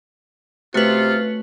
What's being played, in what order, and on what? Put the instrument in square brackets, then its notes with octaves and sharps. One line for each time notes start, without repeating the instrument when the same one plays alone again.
[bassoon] C3 [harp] A3 C4 C#4 [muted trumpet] F4 [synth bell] F#4 B4